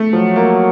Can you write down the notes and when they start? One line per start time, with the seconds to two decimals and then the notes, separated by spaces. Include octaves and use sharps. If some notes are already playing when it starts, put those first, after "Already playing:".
Already playing: A3
0.13 F3 F#3
0.36 A#3